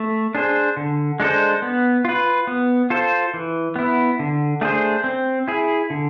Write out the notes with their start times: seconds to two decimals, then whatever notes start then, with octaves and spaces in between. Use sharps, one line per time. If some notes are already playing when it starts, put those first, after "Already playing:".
Already playing: A3
0.35 D4 G#4 C5
0.77 D3
1.20 G#3 D4 A4 C5
1.62 B3
2.05 F4 B4
2.47 B3
2.90 F4 A4 C5
3.34 E3
3.76 B3 E4
4.19 D3
4.61 A3 D4 G#4 C5
5.04 C4
5.48 E4 G#4
5.90 D3